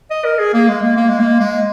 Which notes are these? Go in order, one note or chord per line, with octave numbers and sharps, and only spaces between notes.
D#5
A#4
G#4
A#3
G#3
A#3
A#3
G#3
A#3
G#3